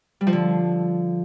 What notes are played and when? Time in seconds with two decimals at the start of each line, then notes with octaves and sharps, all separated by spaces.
0.21 G3
0.27 F3
0.33 D3